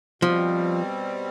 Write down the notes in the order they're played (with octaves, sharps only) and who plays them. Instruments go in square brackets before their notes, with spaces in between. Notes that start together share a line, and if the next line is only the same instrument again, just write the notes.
[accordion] B2 G3 C4 [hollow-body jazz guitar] F3